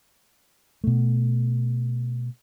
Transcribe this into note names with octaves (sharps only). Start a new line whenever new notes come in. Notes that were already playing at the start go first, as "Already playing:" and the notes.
B2 A3